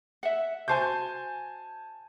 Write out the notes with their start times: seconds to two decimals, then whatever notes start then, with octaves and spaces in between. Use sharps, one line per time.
0.23 E5 F#5
0.68 F#4 C5 G#5 A5 G6